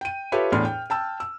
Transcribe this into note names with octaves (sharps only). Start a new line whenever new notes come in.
G5 D#7
F4 G4 A4 B4 C#5 E5
E2 A2 D4 B5 C6 F6
G5
G5 A5 E6
E6